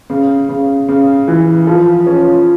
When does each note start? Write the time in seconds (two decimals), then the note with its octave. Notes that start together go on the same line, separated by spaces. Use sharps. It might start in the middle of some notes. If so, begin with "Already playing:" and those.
0.10 C#3
0.49 C#3
0.89 C#3
1.28 E3
1.67 F3
2.07 C#4